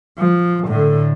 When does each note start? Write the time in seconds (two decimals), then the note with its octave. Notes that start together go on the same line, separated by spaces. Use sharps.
0.18 F3
0.67 A2 D3